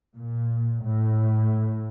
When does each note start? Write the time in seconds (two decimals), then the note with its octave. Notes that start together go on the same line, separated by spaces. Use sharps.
0.16 A#2
0.83 A2